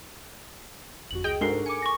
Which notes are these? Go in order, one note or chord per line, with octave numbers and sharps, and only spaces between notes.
G1 F2 F#4 F#7
C#2 G#4 D#5 G5
G#2 D4 F#4 A4 A#4 A#5 C7
G#5 D6 C#7
C#6 A#6